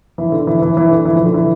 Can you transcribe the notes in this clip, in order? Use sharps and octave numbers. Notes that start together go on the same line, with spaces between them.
E3
D3
E3
E3
E3
D3
E3
F3
D3
E3